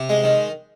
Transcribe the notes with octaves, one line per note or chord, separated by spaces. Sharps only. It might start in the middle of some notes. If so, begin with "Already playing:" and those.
Already playing: C3
G#3
D#3